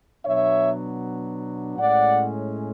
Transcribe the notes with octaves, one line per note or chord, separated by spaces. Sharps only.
B2 F#3 B3 D4 C#5 E5
A2 G#3 C#4 D5 F#5